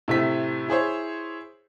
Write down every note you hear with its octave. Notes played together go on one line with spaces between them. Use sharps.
A2 C3 A3 B6
E4 G#4 C5 C#5